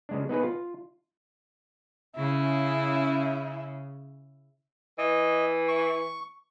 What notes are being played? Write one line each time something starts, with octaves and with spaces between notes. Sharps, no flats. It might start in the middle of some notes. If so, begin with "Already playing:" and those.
C#3 G#3 D4
B3 D#4 G#4 B4
F4
C#3 E4
E3 D#5
C#6